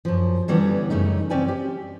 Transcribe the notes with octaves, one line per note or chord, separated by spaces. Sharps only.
F#2 F3
D3 E3 G3 B3 C#4
F#2 C#3 A3 D#4
C4 C#4 D5 G5 G#5
G4